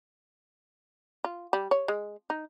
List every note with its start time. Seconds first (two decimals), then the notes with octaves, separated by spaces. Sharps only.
1.24 F4
1.53 G3
1.71 C#5
1.88 G#3
2.30 D#4